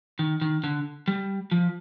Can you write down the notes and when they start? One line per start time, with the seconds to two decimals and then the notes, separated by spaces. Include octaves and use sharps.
0.19 D#3
0.41 D#3
0.64 D3
1.08 G3
1.52 F3